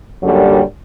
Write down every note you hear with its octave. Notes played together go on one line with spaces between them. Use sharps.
F#2 A#2 D3 F#3 G3